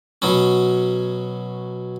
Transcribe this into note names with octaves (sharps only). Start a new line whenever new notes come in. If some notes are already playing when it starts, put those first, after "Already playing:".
B2 F#3 C#4